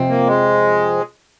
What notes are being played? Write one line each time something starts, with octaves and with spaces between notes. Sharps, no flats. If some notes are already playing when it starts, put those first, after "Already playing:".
Already playing: F2 C3 F3 C4
A#3
G#3